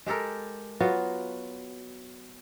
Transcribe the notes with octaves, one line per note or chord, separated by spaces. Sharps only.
G#3 G4 A4 A#4
F#3 B3 F4 F#4